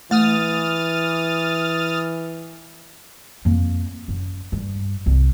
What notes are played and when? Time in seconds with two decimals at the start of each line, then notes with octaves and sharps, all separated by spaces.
0.11 E3 A3 D#6 F6 A6
3.45 F2 A#3
4.08 F#2
4.52 G2
5.06 C2